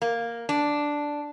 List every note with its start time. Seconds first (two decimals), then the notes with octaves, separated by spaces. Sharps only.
0.02 A#3
0.49 D4